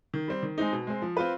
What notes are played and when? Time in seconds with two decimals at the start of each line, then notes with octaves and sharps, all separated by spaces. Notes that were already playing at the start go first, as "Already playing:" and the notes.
0.14 D#3
0.28 G3 C4
0.43 D#3
0.58 G#3 C4 D#4
0.73 B2
0.87 G#3 C4
1.02 F3
1.17 C4 F4 B4